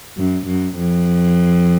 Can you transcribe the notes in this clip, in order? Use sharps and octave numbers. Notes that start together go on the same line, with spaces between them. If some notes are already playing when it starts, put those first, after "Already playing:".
F#2
F#2
F2